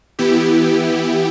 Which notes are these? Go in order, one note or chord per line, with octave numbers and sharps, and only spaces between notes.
E3 B3 E4 G4